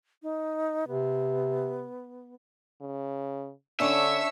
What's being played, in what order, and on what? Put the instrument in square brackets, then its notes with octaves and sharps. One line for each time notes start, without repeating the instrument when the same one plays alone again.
[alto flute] D#4
[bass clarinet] C3 [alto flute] B3
[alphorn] C#3
[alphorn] D3 [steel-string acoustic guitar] C#4 D4 [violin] C#5 E6 [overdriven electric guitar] E5